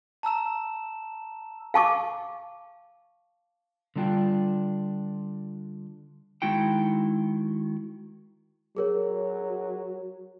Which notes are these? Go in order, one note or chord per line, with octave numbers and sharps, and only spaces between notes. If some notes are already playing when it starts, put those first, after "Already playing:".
A5 A#5 E6 E7
F5 A5 C#6 D6
D3 G3 D4 F4 G5
D#3 G#3 E4 F#4 G5
F#3 G#4 A#4 C#5